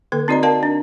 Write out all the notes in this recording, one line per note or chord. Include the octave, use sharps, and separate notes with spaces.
D3 A#3 A4 B4
C4 D#4 F#4 D5 D#5 A#5
A#4 D5 F5 G5 A5
D4